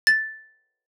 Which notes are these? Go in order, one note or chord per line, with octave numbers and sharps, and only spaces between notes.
A6